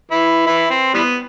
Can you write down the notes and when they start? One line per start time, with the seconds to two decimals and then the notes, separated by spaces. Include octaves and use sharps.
0.11 E3 E4
0.47 E3 E4
0.70 C4
0.94 E3 G3 B3